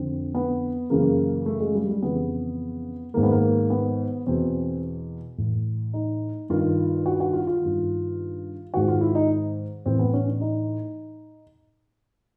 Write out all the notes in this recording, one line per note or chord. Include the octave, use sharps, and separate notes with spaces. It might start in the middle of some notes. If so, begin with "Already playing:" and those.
Already playing: F2 D3 C4
B3
F#2 C#3 E3 A#3
A3
G#3
G3
G3
F2 C#3 E3 B3
G#2 D#3 A#3
B3
A#3
B3
E2 B2 C4
A2 E3
D#4
G2 D#3 F4
F#4
F#4
F4
F4
G2 D#3
G#2 D#3 F#4
F4
E4
D#4
A2 E3 C4
B3
C#4
D4
D#4